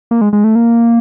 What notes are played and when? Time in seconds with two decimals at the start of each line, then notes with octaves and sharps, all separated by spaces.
0.11 A#3
0.21 G#3
0.33 G#3
0.44 A3
0.55 A#3